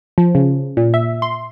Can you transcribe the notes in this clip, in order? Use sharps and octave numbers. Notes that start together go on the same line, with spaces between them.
F3
C#3
A#2
E5
C6